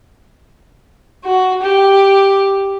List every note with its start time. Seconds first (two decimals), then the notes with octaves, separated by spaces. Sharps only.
1.24 F#4
1.63 G4